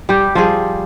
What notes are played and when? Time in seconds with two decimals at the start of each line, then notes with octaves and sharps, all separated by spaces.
0.09 G3 G4
0.35 F3 G3 G#4